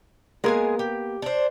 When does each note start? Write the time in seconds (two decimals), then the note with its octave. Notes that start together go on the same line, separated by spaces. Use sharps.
0.44 G#3 A#3 B3 G#4 A#4 G#5
0.79 G4
1.22 D4 C5